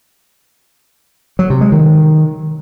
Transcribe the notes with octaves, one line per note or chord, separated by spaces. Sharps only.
F#3
C3
G#3
D#3